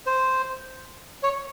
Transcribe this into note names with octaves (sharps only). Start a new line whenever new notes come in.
C5
C#5